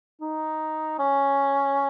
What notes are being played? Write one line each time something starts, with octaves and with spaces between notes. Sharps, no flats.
D#4
C#4